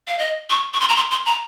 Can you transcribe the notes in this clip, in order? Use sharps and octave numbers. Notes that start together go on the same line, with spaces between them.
F5
D#5
C#6
C#6
C6
A#5
C6
C6
A#5